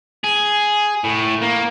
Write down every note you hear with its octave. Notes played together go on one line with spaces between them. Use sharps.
G#4
A2
A#3